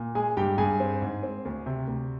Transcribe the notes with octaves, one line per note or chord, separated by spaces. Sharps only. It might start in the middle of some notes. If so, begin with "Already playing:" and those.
Already playing: A#2
G#3 G#4 G#5
G2 G4 G5
G2 G#4 G#5
C4
G#2
C4
D2
C3
D2